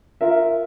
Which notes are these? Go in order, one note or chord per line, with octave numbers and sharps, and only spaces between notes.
F4 A#4 E5